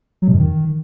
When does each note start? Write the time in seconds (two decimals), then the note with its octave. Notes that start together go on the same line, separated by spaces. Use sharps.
0.22 F#3
0.28 B2
0.33 F#2
0.39 D#3